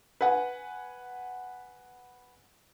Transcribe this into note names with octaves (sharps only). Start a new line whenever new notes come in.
B4 F#5 G#5